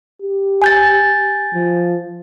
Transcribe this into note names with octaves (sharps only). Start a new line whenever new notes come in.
G4
G#5 G6 A6
F3